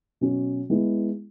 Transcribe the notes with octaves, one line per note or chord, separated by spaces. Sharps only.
B2 F#3 C#4 F#4
G#3 B3 E4